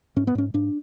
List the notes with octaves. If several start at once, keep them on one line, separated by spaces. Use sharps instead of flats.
G#2 C#4
B3
G#2 C#4
G#2 D4